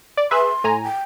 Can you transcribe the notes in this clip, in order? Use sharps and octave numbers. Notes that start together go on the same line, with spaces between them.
D5
G#4 B4 E5 C6
A2 G#5 A#5
G5